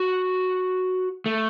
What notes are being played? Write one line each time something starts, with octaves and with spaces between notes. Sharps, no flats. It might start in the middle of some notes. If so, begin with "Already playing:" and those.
Already playing: F#4
A3